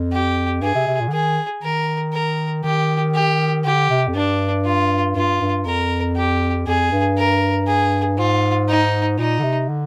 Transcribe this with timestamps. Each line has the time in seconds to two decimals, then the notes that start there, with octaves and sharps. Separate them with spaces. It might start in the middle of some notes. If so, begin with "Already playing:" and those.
Already playing: F2
0.13 G4
0.62 G2 G#4
0.75 C3
0.87 C3
1.00 A#2
1.08 D3
1.12 D#3 G#4
1.63 D#3 A#4
2.13 A#4
2.64 D#3 G4
3.14 G4
3.64 D3 G4
3.90 C3
4.08 F2
4.15 G2 D4
4.65 F4
5.15 G2 F4
5.41 G2
5.66 F2 A#4
6.16 G4
6.67 F2 G#4
6.92 G2
7.17 A#4
7.67 G#4
8.18 G#2 F4
8.69 D#4
9.18 A#2 D#4
9.39 D3
9.43 C3
9.69 D3